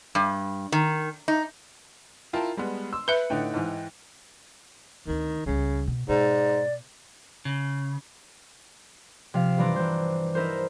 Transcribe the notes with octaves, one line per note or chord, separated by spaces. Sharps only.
G2
D#3
D#4
E4 F4 A#4 G5 A5
G3 G#3 B3
C6 E6
B4 E5 B5 F#6 C#7
A2 D3 D#4 G5
G#2 E3
D2 D#3 C4
C#2 C#3 G3
B2
G#2 B2 D5
C#3
C3 F3 F5
G2 E3 D4 A#5 C6 D6
E3 C5
D#4 E4 A#4 C5